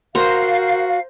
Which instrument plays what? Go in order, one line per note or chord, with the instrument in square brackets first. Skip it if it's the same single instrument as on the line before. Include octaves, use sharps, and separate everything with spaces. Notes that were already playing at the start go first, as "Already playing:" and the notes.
[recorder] F#4 [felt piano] A#4 [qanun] C5 A#5 [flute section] F5